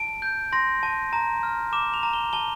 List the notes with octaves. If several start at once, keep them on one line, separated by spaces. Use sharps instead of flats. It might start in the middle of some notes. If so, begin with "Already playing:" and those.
Already playing: A5 D7
G6
C6 A#6
A5
A#5
F6
D6 E7
F7
A#5
G7
A5 G7